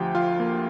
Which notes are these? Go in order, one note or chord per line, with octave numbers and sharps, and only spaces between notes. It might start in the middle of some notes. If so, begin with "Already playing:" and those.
Already playing: D2 F3 G4 G5
F3 F4 F5
A#3